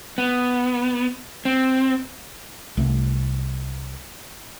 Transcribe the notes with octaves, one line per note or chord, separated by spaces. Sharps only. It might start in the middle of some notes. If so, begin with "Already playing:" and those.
B3
C4
C2 A3